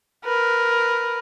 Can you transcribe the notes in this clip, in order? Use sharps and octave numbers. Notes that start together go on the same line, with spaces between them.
A#4 B4